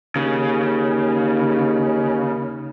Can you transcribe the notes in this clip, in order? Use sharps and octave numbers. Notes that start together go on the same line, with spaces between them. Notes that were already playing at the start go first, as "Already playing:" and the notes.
D#2 C#3